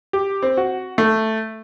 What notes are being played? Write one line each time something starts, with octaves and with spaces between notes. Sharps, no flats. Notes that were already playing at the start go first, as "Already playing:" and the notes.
G4
C4
F#4
A3